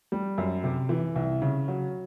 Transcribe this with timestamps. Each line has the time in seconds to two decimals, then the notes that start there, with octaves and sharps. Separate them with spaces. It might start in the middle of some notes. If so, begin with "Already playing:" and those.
0.12 G3
0.38 F#2
0.64 C3
0.89 E3
1.16 C2
1.42 C#3
1.68 F#3